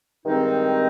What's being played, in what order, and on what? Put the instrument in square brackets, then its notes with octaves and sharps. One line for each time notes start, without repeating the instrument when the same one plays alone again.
[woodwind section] G2 D#3 G#3 C4 D#4